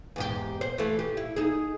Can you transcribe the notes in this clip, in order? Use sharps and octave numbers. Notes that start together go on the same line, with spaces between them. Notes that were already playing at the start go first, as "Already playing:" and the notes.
E2 G#2 G4
C5
E3 A3
G4
E4
D#4 G#4